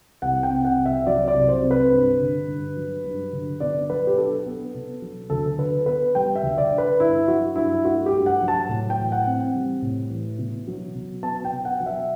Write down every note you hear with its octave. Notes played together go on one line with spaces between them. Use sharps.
C2 F#5
G5
C3
F#5
C2
E5
F#3 D5
D5
C2
C5
C3
B4
G2
D3
G2
F#3
G2
D3
B2 D5
F#3 B4
G4
D4 A4
B3
B2
F#3
D2 A4
D3 B4
B3 B4
G3 G5
E5
D2
D5
D3
B4
G2 E4
F#3 F#4
G2 E4
A3 F#4
G4
G2
F#5
F#3
A5
A2
G5
E3
F#5
C4
G3
A2
E3
B2
F#3
B2
B3 A5
G5
B2
F#5
F#3
E5